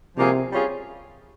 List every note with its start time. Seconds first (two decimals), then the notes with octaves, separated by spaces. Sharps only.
0.17 C3 F3 A#3 F4 G#4
0.52 G3 C#4 F4 G#4